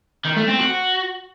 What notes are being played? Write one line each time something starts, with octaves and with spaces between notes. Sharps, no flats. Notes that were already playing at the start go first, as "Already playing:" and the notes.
D#3
A3
C4
F#4